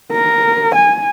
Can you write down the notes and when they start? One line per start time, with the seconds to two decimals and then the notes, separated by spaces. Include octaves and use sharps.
0.12 A#4
0.75 G#5